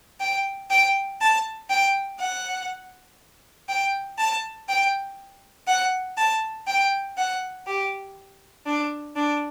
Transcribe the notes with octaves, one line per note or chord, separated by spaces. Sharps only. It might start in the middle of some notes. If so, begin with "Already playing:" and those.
G5
G5
A5
G5
F#5
G5
A5
G5
F#5
A5
G5
F#5
G4
D4
D4